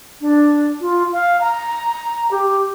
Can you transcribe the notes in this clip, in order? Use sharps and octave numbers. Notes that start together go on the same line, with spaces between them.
D4
F4
F5
A#5
G4